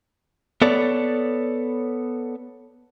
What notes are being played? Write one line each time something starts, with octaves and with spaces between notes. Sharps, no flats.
B3 A4 C#5 D5